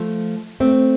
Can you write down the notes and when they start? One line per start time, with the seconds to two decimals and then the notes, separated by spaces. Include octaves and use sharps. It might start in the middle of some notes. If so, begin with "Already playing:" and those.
Already playing: F3 A3
0.60 A3 C4